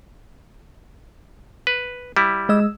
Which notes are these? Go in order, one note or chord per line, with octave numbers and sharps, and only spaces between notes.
B4
G3 E4
G#3 D#5 E6